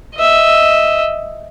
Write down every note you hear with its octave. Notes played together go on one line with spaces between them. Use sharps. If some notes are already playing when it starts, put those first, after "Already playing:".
D#5 E5